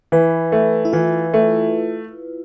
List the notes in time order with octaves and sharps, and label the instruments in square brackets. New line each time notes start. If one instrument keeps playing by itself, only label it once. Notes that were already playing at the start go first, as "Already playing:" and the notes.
[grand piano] E3 [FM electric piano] B4
[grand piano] A3
[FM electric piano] E4
[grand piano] E3 [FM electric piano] F4
[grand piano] A3